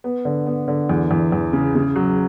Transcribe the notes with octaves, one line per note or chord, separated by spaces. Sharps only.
B3
D3
B3
D3
E2
E2
E2
C#3
C#3
F#3